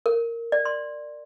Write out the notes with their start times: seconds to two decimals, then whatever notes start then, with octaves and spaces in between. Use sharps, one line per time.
0.06 A#4
0.52 D5
0.65 C6